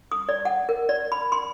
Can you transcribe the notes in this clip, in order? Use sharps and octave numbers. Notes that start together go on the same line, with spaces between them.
D#6
D5
F#5
A#4
D5
B5
C6